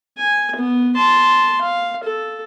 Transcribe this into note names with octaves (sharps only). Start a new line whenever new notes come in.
G#5
B3
A5 C6
F5
A4